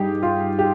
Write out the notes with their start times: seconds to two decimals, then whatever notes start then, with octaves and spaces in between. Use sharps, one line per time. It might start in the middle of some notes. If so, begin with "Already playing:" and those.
Already playing: G2 G3 D#4 G4 G#4
0.23 F4
0.59 G4